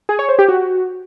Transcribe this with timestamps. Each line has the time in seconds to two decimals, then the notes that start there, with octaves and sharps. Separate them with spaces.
0.09 G#4
0.19 C#5
0.29 C5
0.39 G4
0.48 F#4